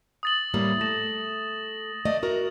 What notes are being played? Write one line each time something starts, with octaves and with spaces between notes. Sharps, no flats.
D#6 A6 F#7
A2 G3 A#3
A3 A#6 E7
A3 D5 D#5
F#4 A#4